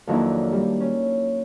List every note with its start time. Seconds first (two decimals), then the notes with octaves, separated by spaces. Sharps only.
0.07 F2 D#3 F#3 A#3 D4 E4
0.52 G3
0.80 C#4